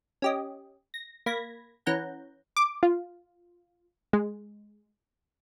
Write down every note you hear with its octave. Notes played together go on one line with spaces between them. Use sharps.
C#4 G4 D#5
A#6
A#3 B5 G#6 A#6
E3 C#4 F#5 A#5 G6
D6
F4
G#3